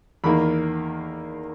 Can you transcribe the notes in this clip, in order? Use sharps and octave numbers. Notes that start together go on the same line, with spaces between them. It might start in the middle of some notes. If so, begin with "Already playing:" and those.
E2 D#3 A#3 B5